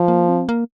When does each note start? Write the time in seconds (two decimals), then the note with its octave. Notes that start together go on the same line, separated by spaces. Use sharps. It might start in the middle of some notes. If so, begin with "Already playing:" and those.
Already playing: F3
0.08 A#3
0.29 C4
0.49 A#3